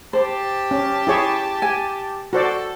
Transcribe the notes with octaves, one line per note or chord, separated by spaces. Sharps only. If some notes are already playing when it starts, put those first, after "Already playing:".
G4 C5 A5
C#4
E4 G#4 C#5
G#5
F#4 A4 C5 D5